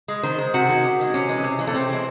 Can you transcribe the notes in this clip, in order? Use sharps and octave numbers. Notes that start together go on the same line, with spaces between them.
G#3
D#3 C5
G#3
C3 F#4
D#3 G#3
C3
D#3 G#3
C3 C#4
E3 G#3
C3
E3 G#3
A3
C3 C4
E3 G#3